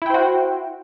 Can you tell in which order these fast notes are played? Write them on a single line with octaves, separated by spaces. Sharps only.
E4 G5 C5 F#4